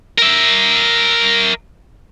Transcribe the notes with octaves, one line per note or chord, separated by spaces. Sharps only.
A#4 E5